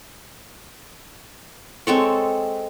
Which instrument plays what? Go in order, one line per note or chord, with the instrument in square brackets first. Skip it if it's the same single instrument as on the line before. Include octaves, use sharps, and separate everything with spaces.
[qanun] G#3 C4 A4 C#5